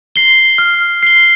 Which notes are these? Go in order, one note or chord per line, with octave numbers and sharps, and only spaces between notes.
C7 G7
F6
C7 G7